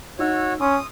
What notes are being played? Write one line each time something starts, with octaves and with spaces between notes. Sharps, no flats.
D#4 F#4 C#5 E6
C#4 C6 D#6